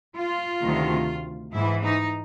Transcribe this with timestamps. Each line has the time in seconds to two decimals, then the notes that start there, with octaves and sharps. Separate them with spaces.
0.16 F4
0.61 D2 C3 D#3
1.52 G#2 E3 E4
1.83 D#4